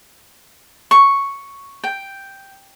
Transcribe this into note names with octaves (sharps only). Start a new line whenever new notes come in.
C#6
G5